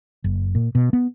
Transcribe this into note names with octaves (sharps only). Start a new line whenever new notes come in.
F#1
A#2
B2
B3